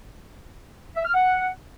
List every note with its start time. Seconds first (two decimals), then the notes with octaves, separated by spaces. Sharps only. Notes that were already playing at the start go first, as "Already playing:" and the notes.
0.96 E5
1.05 F6
1.14 F#5